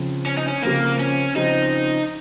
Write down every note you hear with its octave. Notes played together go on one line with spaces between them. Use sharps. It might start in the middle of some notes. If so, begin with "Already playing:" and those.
Already playing: C#3 F3 C4
C#4
D#4
C#4
C#3 F3 A#3 C4
C#4
C#3 F3 C4 D#4